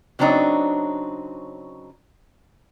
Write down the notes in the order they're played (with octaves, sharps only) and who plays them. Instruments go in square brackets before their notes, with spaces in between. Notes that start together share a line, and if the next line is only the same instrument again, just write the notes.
[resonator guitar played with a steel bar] C#3 F#3 C4 D4 D#4